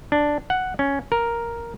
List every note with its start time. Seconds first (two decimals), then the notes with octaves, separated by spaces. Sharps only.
0.12 D4
0.50 F#5
0.79 C#4
1.12 A#4